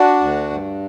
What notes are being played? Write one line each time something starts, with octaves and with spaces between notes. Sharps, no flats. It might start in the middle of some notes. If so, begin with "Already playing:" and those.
Already playing: D4 F#4
D2
G2